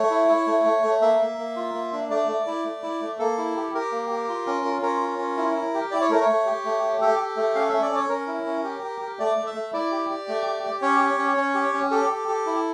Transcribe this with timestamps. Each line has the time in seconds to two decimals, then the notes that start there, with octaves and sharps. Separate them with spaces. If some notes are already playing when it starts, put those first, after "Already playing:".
Already playing: A3 C#5
0.10 E4
0.29 E4
0.47 A3
0.64 A3
0.83 A3
1.01 A#3 E5
1.19 A#3
1.38 A#3
1.56 F4
1.74 A#3
1.93 D4
2.10 A3 D5
2.28 A3
2.47 E4
2.64 A3
2.83 E4
3.01 A3
3.19 A#3 A4
3.38 E4
3.56 G4
3.74 G4 A#4
3.92 A#3
4.10 G4
4.28 F4
4.47 C#4
4.65 F4
4.82 C#4 A#4
5.01 F4
5.18 C#4
5.37 E4
5.55 E4
5.74 G4
5.91 E4 D5
6.01 C#5
6.09 A3 A#4
6.21 C#5
6.29 A3
6.46 G4
6.65 A3
6.83 G4
7.01 G4 A4
7.19 G4
7.37 A3
7.55 C#4 F5
7.69 C#4 E5
7.82 D5
7.92 C#4 C#5
8.09 C#4 A#4
8.27 E4
8.46 C#4
8.64 G4
8.83 G4
9.01 G4
9.19 A3 D5
9.37 A3
9.46 E5
9.55 A3
9.73 E4 D5
9.92 G4
10.10 G4
10.28 A3
10.46 G4
10.63 G4
10.82 C#4 C#5
11.00 G4
11.18 C#4
11.37 C#4
11.54 G4
11.74 C#4
11.91 G4 A4
12.09 G4
12.28 G4
12.46 E4